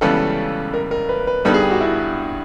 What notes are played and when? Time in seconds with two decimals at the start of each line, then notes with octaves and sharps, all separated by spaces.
0.01 C#2 C#3 E3 G3 B3 A4
0.74 A#4
0.91 A#4
1.09 B4
1.27 B4
1.45 G2 D3 G3 B3 D#4 A4
1.54 G#4
1.62 G4
1.71 F#4
1.81 E4